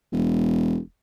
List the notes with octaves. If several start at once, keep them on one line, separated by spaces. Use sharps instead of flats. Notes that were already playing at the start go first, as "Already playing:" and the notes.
E1